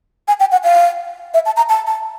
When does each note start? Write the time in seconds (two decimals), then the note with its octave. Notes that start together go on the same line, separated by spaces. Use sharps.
0.28 G#5
0.40 G5
0.51 F#5
0.64 F5
1.34 E5
1.46 A5
1.57 A#5
1.69 A5
1.87 A5